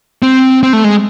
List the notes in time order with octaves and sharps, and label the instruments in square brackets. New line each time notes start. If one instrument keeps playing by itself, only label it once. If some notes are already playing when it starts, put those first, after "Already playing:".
[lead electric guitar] C4
C4
A3
G#3